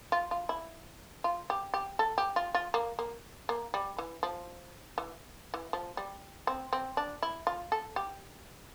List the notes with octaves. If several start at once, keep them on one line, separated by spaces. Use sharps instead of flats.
F4
F4
E4
F4
G4
G4
A4
G4
F4
F4
A#3
A#3
A#3
G3
E3
F3
E3
E3
F3
G3
C4
C4
D4
E4
F4
A4
G4